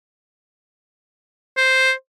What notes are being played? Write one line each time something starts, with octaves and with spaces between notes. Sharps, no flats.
C5